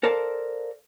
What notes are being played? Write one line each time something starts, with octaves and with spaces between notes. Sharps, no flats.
A4 A#4 C5 D5 F5 A5